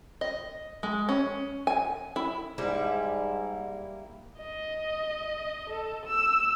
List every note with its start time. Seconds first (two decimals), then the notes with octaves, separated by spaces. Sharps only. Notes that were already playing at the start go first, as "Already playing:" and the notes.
0.21 D#5
0.83 G#3
1.09 C#4
1.67 G#5
2.16 E4
2.58 G#2 G3 A#3 E4
4.38 D#5
5.70 A4
6.06 E6